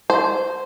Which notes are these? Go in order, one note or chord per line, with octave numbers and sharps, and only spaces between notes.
C5